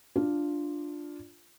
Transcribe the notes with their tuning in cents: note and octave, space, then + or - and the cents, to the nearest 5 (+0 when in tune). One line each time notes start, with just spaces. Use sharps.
D4 +0 F4 +0